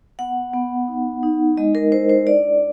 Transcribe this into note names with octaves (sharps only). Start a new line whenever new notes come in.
B3 F#5
B3
D#4
D#4
G#3 D#5
A#4
E4 C5
C5
D4 D5